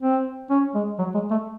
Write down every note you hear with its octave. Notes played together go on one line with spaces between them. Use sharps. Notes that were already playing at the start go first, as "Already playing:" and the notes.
C4
C#4
G#3
F#3
G#3
A3